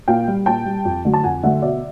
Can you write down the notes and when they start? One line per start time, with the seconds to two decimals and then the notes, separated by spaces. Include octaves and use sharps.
0.08 A#2 F5 G5
0.28 G3
0.46 A#2 G5 A5
0.66 G3
0.85 F2
1.05 D3 F#3 A3
1.14 A5
1.24 F2 F#5 G#5
1.43 D3 F#3 A3 E5 F#5
1.62 B2 D5 E5